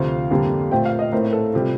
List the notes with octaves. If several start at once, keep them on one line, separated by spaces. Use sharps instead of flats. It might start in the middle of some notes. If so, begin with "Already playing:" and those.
Already playing: D2 C3 F3 C4 F5
F2 D3 G3 A#3
A#2 A3 C4 G5
F5
D#5
A2 A3 C4 A#4
A4
C3 G3 F4